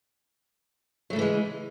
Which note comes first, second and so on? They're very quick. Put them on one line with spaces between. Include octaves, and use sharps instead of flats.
F#3 A3 C#3 E3 G#3